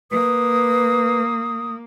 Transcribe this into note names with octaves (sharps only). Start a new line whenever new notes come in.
A#3 B4 D#6